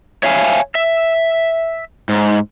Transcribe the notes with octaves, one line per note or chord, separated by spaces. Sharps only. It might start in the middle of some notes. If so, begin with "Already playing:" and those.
C#5 E5 F5 G#5
E5
G#2